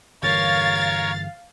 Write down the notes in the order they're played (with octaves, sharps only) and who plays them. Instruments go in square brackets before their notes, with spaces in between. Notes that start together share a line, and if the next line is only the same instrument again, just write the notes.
[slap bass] G1 E3 [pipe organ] A#4 C#5 [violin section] F5 A6